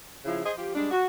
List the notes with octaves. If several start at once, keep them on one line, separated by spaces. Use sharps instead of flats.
C#3 F3 E4
G#4 C5 D#5
F3 F4 G4
G3 G#3 D4
F#4